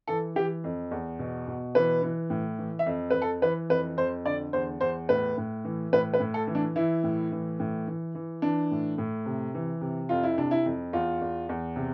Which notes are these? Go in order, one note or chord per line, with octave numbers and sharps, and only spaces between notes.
E3 A4
E3 G4
F2
E2
B2
B2
E3 B4
E3
A2
E3
E5
F2
F2 B4
A4
E3 B4
F2 B4
F2 C5
D3 D5
E2 C5
E2 C5
A2 B4
A2
E3
A2 B4
B4
A2
A4
E3
D4
E3 E4
A2
E3
A2
E3
E3
E3 D4
A2
A2
C3
E3
C3
F2 F4
E4
C3 D4
E4
F2
E2 F4
E2
E2
C3